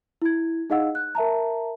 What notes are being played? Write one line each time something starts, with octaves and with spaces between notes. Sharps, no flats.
E4 G#6
D#4 G#4 D#5 F5 F#5 E6
F#6
A#4 E5 A5 A#5